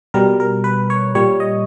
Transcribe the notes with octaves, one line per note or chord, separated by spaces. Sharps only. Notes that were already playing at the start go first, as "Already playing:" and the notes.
B2 G3 A#4
A#4
B4
C#5
A#2 G3 C#5
D#5